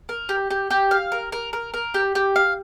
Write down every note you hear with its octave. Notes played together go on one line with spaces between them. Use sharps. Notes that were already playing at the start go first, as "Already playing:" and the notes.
A#4
G4
G4
G4
F5
A#4
A#4
A#4
A#4
G4
G4
F5